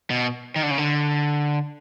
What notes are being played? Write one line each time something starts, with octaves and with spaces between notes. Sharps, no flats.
B2
D#3
D3
C#3
D3